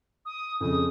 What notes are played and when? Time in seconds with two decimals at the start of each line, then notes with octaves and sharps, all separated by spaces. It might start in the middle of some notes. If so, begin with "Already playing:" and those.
0.26 D#6
0.61 F2 C#3 D#6